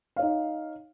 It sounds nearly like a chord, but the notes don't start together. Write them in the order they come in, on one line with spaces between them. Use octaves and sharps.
F5 C#5 D#4